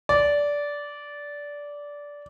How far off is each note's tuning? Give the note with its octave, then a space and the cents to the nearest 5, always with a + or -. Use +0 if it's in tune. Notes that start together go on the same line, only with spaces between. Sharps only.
D5 -15